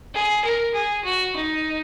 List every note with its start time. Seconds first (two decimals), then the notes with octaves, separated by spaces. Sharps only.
0.14 G#4
0.44 A#4
0.74 G#4
1.04 F#4
1.36 D#4